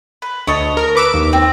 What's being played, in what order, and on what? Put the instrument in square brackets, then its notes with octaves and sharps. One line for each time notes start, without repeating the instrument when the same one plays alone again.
[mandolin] B4
[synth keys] D2 [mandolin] C#5 D#5 A5
[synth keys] A#4
B4 D6 E6
D#2
[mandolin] C4